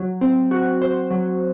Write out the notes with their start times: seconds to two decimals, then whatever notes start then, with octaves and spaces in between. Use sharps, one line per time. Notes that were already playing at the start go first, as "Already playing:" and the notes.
Already playing: F#3
0.21 C4
0.51 F#4
0.82 C5
1.11 F#3